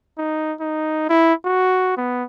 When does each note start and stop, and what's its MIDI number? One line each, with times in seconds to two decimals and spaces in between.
0.18 0.54 63
0.60 1.07 63
1.09 1.33 64
1.45 1.93 66
1.97 2.24 59